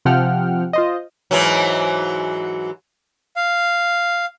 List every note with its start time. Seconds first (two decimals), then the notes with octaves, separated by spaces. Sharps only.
0.05 C3 F3 F#5 G5 F6
0.73 F4 C5 D#5
1.31 G#2 E3 F#3
3.36 F5